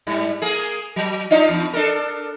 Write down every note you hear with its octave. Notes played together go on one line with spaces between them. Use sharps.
G#2 G3
A#3 G#4
F#3
D4 D#4 F4
E2
D4 A4 A#4